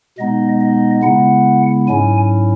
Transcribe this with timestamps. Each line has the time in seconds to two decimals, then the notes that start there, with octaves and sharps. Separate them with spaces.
0.18 B2 G#3 B3 D#4 D#5
0.61 D#5
1.03 C#3 G#3 B3 E4 F#5
1.88 G#2 F#3 C#4 E4 G#5